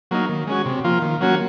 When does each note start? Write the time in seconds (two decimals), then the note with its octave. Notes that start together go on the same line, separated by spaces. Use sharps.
0.11 F#3 A#3 D#4
0.29 D#3
0.47 G#3 C#4 F#4
0.65 C3
0.84 F3 A#3 F4
1.02 D#3
1.21 F#3 A#3 C#4 F#4